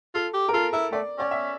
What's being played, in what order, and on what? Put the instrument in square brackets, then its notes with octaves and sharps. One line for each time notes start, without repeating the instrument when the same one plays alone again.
[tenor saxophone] F4 [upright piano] A4
[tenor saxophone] G4
[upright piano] A#4
[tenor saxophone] F4 [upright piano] A4
[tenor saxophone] E4 [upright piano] A#4
[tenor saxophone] A3 [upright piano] D5
[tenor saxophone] C#4 [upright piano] D5
[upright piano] E5